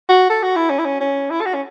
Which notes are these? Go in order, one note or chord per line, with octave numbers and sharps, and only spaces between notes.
F#4
A4
F#4
E4
C#4
E4
C#4
C#4
E4
A4
F#4
C#4